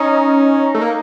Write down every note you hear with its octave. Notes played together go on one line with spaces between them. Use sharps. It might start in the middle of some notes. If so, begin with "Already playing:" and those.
Already playing: C#4 D#4
A3
A#3